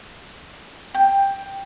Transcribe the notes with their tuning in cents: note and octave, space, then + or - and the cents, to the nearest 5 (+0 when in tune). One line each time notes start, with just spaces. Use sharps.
G5 +10